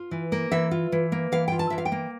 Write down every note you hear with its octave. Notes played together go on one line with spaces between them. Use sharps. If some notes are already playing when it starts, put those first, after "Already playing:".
Already playing: F4
E3
A#3
E3 E5
F4
E3
A#3
E3 F5
F4 G5
A5
E3 E5
F5
G5
A#3